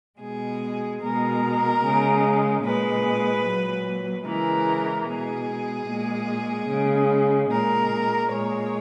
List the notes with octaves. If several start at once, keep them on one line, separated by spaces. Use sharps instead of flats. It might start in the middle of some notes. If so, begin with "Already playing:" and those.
B2 G#3 G#4
B2 G#3 A#4
C#3 G#3
A#2 G#3 B4
A#2 F#3
C#3 E3 G#3 A#4
B2 G#3 G#4
A#2 G#3
C#3 G#3
A#2 G#3 A#4
A#2 G#3 C#5